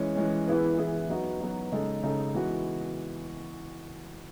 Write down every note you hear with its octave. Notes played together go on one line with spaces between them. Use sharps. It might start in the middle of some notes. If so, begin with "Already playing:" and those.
Already playing: E3 G#3 C#4
E3 G#3 C#4
E3 B3 E4 G#4 B4
E3 B3 E4 G#4 B4
F#3 B3 D#4 F#4
F#3 B3 D#4 F#4
C#3 G#3 D#4 A4
C#3 G#3 D#4 A4
E3 G#3 B3 F#4